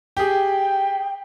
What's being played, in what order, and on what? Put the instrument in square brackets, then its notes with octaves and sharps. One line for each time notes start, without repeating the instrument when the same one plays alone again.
[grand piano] G4 G#4 [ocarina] G5